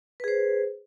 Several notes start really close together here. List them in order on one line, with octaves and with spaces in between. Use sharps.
B4 G#4 C5